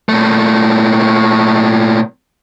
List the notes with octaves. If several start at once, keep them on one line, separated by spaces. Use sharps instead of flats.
A#2 A3